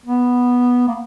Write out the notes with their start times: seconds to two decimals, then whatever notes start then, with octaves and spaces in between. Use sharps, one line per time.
0.06 B3
0.88 A#3